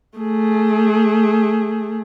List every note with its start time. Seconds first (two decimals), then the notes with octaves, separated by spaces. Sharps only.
0.19 A3 G#4